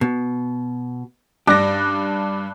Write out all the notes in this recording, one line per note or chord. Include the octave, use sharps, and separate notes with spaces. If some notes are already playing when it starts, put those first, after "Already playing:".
B2
G2 D4 G4 A#6